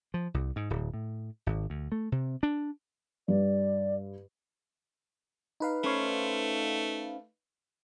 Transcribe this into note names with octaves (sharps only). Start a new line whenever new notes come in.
F3
C2
G#2
D1
A2
G#1
D2
A3
C3
D4
G2 D5
D#4 B4 F5
A3 C#4 C5 C#5